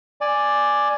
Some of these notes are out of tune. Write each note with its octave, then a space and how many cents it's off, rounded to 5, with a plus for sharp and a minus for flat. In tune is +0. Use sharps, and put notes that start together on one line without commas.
D5 +5 G#5 +0